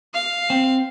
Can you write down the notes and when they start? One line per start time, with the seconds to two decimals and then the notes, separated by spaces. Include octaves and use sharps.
0.14 F5
0.50 C4